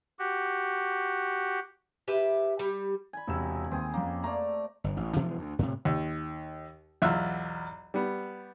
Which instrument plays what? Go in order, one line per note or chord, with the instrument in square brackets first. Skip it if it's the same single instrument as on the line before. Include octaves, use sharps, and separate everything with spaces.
[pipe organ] F#4 G4
[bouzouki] G4 B4 E5
G3
[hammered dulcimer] G#5 B5
[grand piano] E1 C3 E6
[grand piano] D#2 [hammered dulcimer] C4 G#4
[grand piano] F2 C#4 [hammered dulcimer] A#3
[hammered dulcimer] A3 D5 [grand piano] A#5
[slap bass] G1
A1
B2 E3 F3 G#3
D2
A2 C3
[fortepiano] D#2
B1 E2 F4 E5 F#6
G3 B3